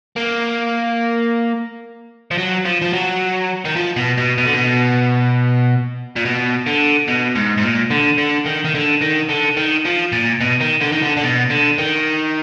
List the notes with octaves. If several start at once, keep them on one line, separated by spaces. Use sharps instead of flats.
A#3
F3
F#3
F3
F3
F#3
D#3
F3
B2
B2
B2
D3
B2
A#2
B2
D3
B2
G#2
G#2
A#2
D3
D3
D#3
D#3
D3
D#3
D3
D#3
F3
A#2
B2
D#3
D3
D#3
D3
D3
B2
D3
D#3